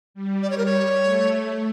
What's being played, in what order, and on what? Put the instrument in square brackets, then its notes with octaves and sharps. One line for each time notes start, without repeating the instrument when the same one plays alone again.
[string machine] G3
[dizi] D5
C#5
A#4
C#5
[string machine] A3